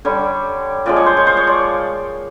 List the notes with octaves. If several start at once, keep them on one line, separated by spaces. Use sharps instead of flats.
D3 G3 C#5
A#2 F3 G#3 D5
C#5
C5
C#5
C5
C#5
D5